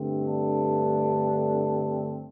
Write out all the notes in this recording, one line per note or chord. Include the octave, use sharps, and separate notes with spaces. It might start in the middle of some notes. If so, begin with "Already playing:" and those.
Already playing: G2 D3 A3 C4
D4